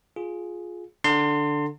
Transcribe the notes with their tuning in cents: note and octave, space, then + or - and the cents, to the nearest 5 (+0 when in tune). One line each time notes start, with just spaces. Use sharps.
F4 +15 G#4 +10
D3 +0 A5 +45 C6 +0